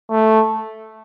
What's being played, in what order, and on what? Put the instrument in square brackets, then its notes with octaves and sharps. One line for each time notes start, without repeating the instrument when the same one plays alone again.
[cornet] A3